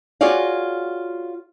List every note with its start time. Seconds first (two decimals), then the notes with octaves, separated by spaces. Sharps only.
0.21 F4 F#4 G#4 C#5 D5 F5